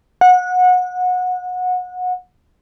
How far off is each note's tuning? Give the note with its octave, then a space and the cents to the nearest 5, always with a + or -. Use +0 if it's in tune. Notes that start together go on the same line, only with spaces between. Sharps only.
F#5 -25